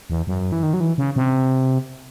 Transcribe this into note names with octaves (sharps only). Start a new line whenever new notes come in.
E2
F#2
E3
D#3
F#3
E3
C#3
C3